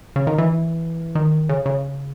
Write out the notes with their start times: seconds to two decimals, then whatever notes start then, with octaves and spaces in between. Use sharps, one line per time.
0.16 C#3
0.27 D#3
0.38 E3
1.15 D#3
1.49 C#3
1.66 C#3